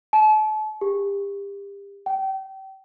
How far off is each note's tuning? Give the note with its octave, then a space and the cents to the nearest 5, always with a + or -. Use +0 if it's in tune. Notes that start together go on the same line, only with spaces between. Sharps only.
A5 -40
G4 +30
G5 -30